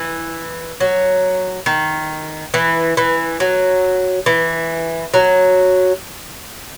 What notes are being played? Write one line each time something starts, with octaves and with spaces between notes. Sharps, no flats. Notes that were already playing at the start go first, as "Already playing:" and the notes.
Already playing: E3
F#3
D#3
E3
E3
F#3
E3
F#3